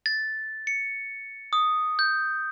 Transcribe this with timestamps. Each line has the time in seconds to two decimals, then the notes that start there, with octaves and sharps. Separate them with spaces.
0.06 A6
0.67 C#7
1.53 D#6
1.99 G6